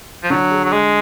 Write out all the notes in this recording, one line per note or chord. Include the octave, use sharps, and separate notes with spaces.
F3
D3 F#3
G#4
F#3
G#3 G#4